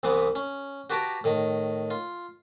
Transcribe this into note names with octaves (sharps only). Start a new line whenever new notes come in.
C2 C3 E3 B3
C#4
F#4 G4 B4 A5 A#5 D6
A2 D#3
F4